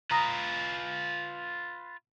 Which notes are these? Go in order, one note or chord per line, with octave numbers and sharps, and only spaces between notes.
F4 B4 A#5 D#6 A#6